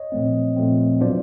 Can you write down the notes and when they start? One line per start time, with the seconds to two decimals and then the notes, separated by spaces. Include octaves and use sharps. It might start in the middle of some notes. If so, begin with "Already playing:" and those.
Already playing: C#5 D#5
0.12 A#2 F3 A3 C4
0.56 A#2 F3 A3 C4
1.01 B2 F#3 B3 D4 F4 C5 D5